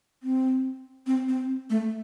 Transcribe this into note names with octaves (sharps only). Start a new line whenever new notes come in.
C4
C4
C4
A3